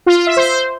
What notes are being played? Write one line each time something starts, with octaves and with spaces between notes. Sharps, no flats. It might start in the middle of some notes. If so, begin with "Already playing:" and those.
F4
F4
E5
C5